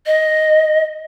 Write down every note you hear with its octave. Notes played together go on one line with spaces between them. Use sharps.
D#5